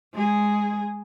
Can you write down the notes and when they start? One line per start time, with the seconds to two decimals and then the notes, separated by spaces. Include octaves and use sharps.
0.14 G#3 G#4